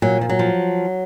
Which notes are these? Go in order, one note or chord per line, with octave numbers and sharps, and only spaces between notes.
A#2 F#3
F3
F#3
F3